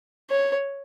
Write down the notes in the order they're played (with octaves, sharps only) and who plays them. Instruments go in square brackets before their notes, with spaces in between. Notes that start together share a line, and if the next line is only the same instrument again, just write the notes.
[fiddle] C#5